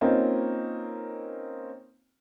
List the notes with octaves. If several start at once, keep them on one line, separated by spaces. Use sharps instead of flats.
A#3 C4 C#4 D#4 F4 B4